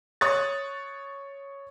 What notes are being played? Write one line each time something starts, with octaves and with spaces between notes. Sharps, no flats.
C#5 C#6 D#6 F#6 A6